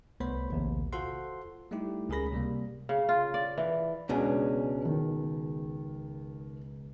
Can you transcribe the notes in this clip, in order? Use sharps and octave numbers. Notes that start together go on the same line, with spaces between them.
C2 A3 B3 C5 C#5 B5
A#1 D#2 C3
F4 F#4 A4 C5 F#5 C6
G3 A3 D#4 E4 G4
C#2 C#4 G#4 A#4 B5 A#6
C3 G3 A#3
C#3
F4
D5
E3
C#2 B2 G#3 C#4 D4
D#3